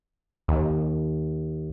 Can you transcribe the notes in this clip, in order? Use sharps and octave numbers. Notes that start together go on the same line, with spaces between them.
D#2